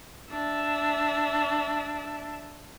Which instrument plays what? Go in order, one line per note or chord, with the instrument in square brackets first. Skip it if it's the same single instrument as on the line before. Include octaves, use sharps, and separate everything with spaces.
[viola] D4 E5